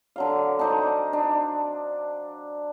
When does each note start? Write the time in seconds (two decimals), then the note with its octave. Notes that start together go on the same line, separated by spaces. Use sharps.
0.16 D3 F#3 F5
0.59 D4 D#4 C5
1.13 D4